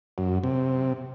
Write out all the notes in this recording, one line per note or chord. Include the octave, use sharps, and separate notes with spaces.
F#2
C3